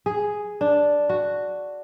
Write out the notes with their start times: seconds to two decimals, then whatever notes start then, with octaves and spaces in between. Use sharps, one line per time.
0.06 G#4
0.61 D4
1.10 F#4